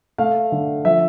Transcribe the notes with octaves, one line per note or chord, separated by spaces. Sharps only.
A3 F5
D3
F3 E5